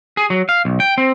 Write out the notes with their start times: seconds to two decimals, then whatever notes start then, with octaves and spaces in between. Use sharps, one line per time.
0.17 G#4
0.30 F#3
0.49 F5
0.65 B1
0.80 G5
0.98 C4